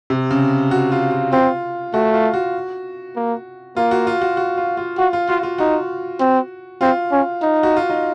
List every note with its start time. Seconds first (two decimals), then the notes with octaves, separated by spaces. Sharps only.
0.10 C3
0.31 C#3
0.71 F#4
0.92 F4
1.12 F4
1.32 C4 F4
1.93 A3 F#4
2.14 F4
2.34 F#4
3.16 A#3
3.76 A#3 F4
3.91 F#4
4.07 F4
4.21 F#4
4.37 F#4
4.57 F4
4.77 F4
4.98 F4 F#4
5.13 F4
5.28 F4 F#4
5.43 F4
5.58 D#4 F#4
6.20 C4
6.81 C4 F4
7.12 C#4
7.42 D#4
7.63 F#4
7.77 F4
7.90 D#4